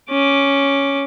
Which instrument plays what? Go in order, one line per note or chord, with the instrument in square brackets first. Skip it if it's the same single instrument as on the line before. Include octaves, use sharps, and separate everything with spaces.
[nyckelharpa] C#4 D6